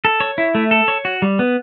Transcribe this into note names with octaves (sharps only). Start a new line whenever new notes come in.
A4
C#5
E4
A3
A4
C#5
F#4
G3
B3